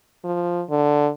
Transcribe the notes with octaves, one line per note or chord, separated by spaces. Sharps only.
F3
D3